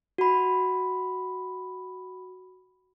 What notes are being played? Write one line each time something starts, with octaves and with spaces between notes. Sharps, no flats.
F#4 B5